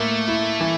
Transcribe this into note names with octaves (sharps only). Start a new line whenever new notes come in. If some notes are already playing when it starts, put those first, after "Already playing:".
Already playing: A2 A3 A#3
E4
E3